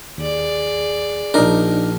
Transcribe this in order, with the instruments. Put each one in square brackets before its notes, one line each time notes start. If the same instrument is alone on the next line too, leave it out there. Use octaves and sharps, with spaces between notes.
[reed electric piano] D#2 [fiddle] G#4 D5
[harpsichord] A#1 A#4 [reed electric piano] D4 D#4